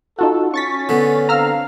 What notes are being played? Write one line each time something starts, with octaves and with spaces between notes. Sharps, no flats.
D#4 F4 F#4 A4
C#4 C#6 A6 B6
D3 B3
C4 D4 F5 A#5 E6 F6